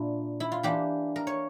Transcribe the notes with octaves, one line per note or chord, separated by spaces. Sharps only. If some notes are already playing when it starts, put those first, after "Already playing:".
Already playing: A#2 D4 E4
E4
F4
E3 A#3 D4 G4
A#4
C#5